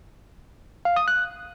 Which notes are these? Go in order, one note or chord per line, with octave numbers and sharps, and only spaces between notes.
F5
D#6
F#6